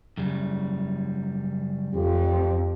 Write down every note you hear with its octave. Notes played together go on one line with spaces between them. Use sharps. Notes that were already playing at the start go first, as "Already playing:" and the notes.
F#2 C#3 G3
F2 G4